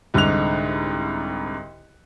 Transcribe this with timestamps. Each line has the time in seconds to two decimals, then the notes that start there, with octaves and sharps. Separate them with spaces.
0.14 C2 G#2 D3 D#4 F#6 F7